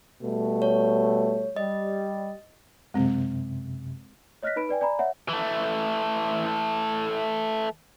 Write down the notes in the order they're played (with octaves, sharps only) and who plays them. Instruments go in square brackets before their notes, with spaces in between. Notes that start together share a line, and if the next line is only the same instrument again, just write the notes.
[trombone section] B2 G3 A3
[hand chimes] C#5
[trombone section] G3 [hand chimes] D#5
[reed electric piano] F#2 C3 [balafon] G#3 C4
[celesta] C#5 D#5 F6 F#6 A#6 B6
D#4 B4 B5 D7
B4 D5 G5 G#5
D5 G#5 A#5 B5
C#5 E5 F#5
[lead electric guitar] E3 A3